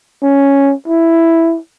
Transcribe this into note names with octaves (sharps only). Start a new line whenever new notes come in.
C#4
E4